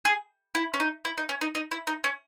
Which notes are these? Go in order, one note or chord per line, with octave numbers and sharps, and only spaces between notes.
G#4
E4
C#4
D#4
E4
D#4
C#4
D#4
D#4
E4
D#4
C#4